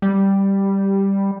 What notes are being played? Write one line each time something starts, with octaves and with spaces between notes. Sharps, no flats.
G3